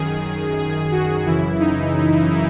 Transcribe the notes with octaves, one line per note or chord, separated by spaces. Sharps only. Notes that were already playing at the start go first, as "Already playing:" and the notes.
Already playing: F#2 D#3 G#4
G#4
F#4
F#2 C#3 E3 E4
D#4